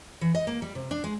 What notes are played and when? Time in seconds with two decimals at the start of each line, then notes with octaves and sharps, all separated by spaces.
0.21 E3
0.35 D#5
0.47 A#3
0.62 G3
0.75 C3
0.91 D4
1.04 G#3